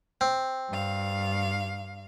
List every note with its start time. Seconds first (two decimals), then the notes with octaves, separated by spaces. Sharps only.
0.21 C4
0.69 G2 F5